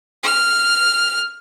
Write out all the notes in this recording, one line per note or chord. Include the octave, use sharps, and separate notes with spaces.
F6